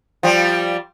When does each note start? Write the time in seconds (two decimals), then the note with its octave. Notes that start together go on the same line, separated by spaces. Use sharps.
0.23 F3 G3